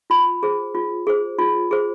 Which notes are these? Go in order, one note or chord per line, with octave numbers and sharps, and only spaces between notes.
F4 B5
G#4 C5
F4
G#4 C5
F4
G#4 C5